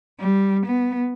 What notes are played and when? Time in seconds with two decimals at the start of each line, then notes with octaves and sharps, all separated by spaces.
0.20 G3
0.66 B3